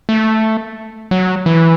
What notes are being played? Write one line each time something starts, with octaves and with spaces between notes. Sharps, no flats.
A3
F#3
E3